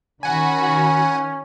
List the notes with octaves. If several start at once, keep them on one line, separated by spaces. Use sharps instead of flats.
D#3 C#4 F#4 F#5 G#5 B5